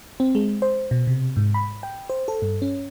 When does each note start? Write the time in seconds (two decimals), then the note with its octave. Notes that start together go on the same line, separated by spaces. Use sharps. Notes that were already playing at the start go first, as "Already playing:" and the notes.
0.20 C4
0.35 G#3
0.62 C5
0.91 B2
1.07 C3
1.37 G#2
1.54 B5
1.83 G5
2.10 C5
2.28 A4
2.42 G2
2.62 C#4